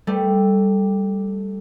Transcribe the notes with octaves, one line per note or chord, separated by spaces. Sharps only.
G3 A3